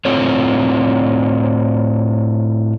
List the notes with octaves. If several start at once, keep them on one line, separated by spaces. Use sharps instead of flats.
A2 C4 F4 A4 C#5